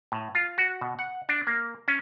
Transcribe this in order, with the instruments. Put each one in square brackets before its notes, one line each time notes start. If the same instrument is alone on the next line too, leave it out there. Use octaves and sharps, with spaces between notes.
[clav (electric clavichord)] A2
F4
F#4
B2
F#5
D4
A#3
C#4